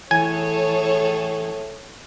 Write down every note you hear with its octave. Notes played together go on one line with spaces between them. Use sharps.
A2 E3 G#4 A4 C#5 G#5